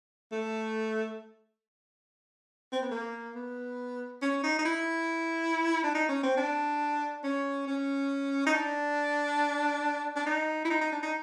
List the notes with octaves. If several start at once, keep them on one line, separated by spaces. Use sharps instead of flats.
A3
C4
B3
A#3
B3
C#4
D#4
D#4
E4
D4
D#4
C#4
C4
D4
C#4
C#4
D#4
D4
D4
D#4
E4
D#4
D#4
D4
D#4